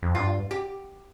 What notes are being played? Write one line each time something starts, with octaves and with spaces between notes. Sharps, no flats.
F2
G2 F4
G4